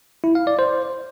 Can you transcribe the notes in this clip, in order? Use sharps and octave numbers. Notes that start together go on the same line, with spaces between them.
E4
F5
D5
C5